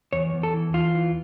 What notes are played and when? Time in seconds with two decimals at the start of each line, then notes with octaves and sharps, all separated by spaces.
0.13 E2 C#5
0.34 E2
0.43 A4
0.54 E3
0.74 E2 F4
0.95 E3